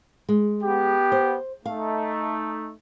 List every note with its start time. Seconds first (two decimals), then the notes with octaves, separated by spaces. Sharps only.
0.29 G#3
0.64 B3 G4
1.12 C5
1.65 A3 D#4 F5